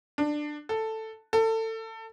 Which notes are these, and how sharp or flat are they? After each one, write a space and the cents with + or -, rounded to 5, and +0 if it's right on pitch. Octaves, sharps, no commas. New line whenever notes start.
D4 +15
A4 +5
A4 +25